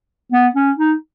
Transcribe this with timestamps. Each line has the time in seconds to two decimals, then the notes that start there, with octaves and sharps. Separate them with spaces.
0.32 B3
0.55 C#4
0.77 D#4